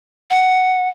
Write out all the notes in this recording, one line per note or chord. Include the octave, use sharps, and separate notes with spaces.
F#5